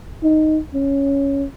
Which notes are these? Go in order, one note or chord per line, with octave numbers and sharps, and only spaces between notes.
D#4
C#4